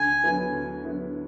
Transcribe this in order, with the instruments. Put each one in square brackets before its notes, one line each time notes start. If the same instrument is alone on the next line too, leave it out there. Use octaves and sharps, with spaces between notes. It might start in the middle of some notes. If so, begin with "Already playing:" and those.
Already playing: [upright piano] D2 [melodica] G#5
[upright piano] D3 F#3 B3 E4
D2
D3 F#3 B3 E4